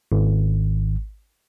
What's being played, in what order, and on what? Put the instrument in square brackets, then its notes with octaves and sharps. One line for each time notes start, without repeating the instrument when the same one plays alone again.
[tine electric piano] G#1